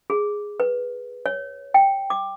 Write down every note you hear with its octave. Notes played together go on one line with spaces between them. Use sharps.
G#4
B4
C#5
G5
D6